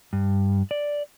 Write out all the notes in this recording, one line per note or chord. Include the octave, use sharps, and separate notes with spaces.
G2
D5